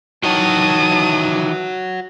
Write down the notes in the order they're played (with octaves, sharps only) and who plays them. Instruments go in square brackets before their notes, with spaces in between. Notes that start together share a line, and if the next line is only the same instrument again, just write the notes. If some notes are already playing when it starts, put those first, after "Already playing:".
[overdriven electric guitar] D#3 E3 [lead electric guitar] F#4 C#5 [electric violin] A5 D#6